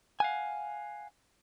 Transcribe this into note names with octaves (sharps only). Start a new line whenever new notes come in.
F5 F#5 G#5